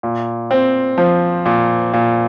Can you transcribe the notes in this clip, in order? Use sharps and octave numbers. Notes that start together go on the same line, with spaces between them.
A#2
C4
F3
A#2
A#2